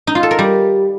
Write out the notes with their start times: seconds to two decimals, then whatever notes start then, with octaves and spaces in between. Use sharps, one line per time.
0.07 D#4
0.15 F4
0.23 A4
0.31 A#4
0.39 G3